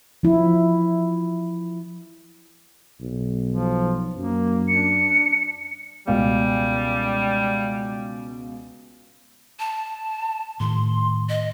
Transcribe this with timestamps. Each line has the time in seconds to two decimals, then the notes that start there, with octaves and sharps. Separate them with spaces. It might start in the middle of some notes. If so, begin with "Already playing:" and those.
0.23 F3 E4
3.01 B1
3.51 F3
4.16 F#2 A#3
4.68 D4 C#7
6.07 C#2 B2 G3 F5
9.59 A5
10.60 A2 D#3 C6
11.29 D#5